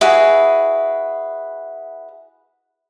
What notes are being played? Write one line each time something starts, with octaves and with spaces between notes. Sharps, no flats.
E4 F#4 G#4 B4